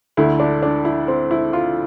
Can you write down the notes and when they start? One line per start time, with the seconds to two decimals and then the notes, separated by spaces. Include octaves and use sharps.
0.17 D2 D3 A3 E4
0.40 D4
0.63 D4
0.85 E4
1.08 C4
1.31 E4
1.53 F4